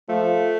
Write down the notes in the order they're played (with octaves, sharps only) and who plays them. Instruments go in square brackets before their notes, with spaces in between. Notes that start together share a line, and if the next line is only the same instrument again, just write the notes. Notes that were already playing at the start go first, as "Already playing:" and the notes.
[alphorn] F3 [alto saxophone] A3